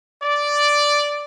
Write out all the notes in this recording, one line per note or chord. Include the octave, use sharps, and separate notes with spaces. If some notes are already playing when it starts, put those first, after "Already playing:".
D5